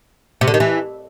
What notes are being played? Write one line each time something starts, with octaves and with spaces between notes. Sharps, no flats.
C3
D3
D#3
E3